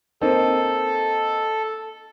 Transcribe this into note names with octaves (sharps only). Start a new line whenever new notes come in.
A#3 C4 D#4 A4